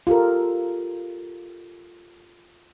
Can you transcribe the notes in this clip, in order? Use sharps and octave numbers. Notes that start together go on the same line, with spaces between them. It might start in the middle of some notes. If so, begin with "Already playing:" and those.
F4 G4 A4 A#4